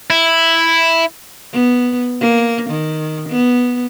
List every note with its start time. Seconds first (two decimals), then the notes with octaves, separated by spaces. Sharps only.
0.10 E4
1.53 B3
2.21 A#3
2.70 D#3
3.29 B3